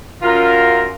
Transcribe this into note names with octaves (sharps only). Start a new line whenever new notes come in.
F#2 F4 A#4